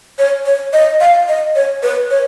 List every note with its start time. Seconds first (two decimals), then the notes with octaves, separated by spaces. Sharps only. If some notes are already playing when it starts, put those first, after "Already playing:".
0.19 C#5
0.46 C#5
0.73 D#5
1.00 F5
1.28 D#5
1.56 C#5
1.83 B4
2.11 C#5